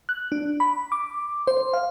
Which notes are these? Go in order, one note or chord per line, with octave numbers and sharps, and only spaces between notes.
F#6
D4
B5
D6
C5
F5